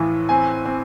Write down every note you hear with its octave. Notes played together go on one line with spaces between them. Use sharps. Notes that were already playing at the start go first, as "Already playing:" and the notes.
Already playing: A2 E3 F3
C4 G#5
C4